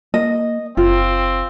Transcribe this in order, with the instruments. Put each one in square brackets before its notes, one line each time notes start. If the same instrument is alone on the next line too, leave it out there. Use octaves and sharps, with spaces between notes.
[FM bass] A#3 [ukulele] D#5
[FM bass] F#1 [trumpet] C4 [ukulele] F4